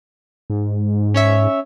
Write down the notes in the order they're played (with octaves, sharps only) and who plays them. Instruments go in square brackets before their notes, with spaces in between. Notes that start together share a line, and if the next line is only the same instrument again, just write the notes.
[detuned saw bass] G#2
[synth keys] C#4 C#5 E5